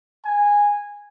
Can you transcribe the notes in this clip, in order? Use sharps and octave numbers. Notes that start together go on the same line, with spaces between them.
G#5